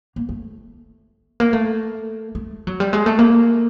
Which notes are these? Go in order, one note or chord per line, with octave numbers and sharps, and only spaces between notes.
A#3
A3
A#3
A3
A3
F#3
G3
G#3
A3
A#3